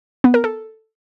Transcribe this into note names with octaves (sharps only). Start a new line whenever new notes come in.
B3
A#4
A4